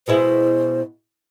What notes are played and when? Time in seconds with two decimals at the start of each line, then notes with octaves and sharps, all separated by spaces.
0.08 B2 G#3 E4 C5